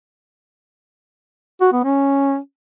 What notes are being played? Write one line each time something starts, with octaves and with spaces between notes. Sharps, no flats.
F#4
B3
C#4